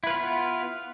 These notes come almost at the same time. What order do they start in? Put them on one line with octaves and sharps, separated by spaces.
E4 B4 F4 B3